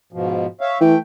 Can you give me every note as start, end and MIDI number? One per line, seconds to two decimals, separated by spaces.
0.13 0.46 44
0.13 0.46 47
0.13 0.46 53
0.61 0.78 73
0.61 0.78 76
0.61 0.78 77
0.81 0.95 52
0.81 0.98 57
0.81 0.98 79